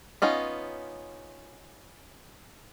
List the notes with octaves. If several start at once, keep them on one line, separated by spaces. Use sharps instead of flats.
B3 C#4 D#4 F4